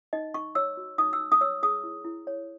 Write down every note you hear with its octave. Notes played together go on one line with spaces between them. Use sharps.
D#4 D#5
D#4 C#6
C#5 E6
F#4
D#4 D#6
E6
D#4
D#6
C#5 E6
G#4 D#6
E4
E4
C#5